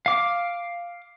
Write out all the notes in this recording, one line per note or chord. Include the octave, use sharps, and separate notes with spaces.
F5 D6